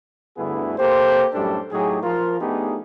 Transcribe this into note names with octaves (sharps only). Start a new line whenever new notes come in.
D2 G2 D3 B3 E4 G#4
A#3 G4 A4 C5
F#2 A2 G3 D4 G4 A4
A2 F#3 D#4 G4 G#4
F3 F4 A#4
A3 B3 D4 D#4 G4 G#4